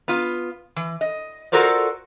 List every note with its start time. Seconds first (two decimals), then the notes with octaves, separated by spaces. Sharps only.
0.08 B3 F4
0.76 E3
1.01 D#5
1.52 F4 F#4 A4 A#4 C5 D5